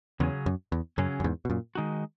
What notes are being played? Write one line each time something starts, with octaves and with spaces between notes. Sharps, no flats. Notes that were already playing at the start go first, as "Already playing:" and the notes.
E2 C#3 F#3 C#4 G#4
F#2
E2
F#2 C#3 F#3 C#4 G#4
F#2
E2 G#2
B2
F#2 A#2
D#3 G#3 D#4 F#4